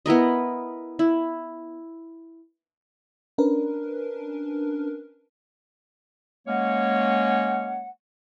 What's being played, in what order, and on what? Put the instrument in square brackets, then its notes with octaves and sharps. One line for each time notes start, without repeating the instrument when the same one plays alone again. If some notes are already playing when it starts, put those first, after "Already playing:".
[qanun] B3 E4 A#4 D#5
E4
[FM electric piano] C#4 D4 A#4 B4
[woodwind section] G#3 A#3 C#4 C#5 F#5